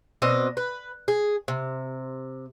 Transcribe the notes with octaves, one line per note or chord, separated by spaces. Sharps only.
B2 C4 D4 D#5
B4
G#4
C3